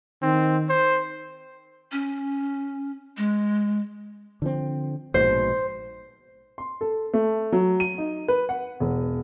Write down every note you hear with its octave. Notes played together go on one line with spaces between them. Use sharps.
D#3 C4
C5
C#4
G#3
D3 F3 C4
A#1 G#2 B2 C5
C6
A4
A3
F#3
D#7
D#4
B4
F#5
E1